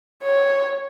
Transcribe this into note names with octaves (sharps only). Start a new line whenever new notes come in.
C#5